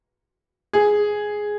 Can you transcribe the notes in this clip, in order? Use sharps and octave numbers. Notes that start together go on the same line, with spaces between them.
G#4